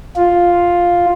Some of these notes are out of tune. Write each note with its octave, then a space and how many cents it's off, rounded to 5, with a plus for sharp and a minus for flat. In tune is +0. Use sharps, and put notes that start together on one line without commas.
F4 +5